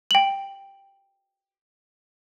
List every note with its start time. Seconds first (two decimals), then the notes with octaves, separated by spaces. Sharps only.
0.11 G5 F#7